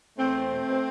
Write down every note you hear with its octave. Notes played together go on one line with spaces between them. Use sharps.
E2 A3 C4
E2
B2
B2